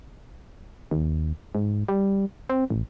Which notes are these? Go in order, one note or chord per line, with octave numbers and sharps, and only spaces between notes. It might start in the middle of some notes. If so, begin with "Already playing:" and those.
D#2
G#2
G3
C4
A1